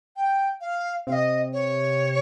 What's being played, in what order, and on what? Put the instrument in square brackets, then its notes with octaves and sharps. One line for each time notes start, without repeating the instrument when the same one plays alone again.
[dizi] G5
F5
[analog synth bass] C3 [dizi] F5
[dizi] D#5
C#5